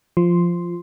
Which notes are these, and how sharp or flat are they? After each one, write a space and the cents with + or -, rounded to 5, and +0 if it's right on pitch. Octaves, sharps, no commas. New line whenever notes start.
F3 -5 C6 +0